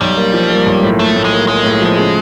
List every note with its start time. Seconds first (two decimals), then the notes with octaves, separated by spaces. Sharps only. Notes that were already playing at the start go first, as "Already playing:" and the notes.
0.01 B1 G3
0.17 A#3
0.34 F3
0.50 A#3
0.66 B1
0.83 A2
0.99 A2 A3
1.16 A2
1.25 G#3
1.33 A#3
1.48 G#3 A#3
1.65 A2
1.82 F3
1.97 C#3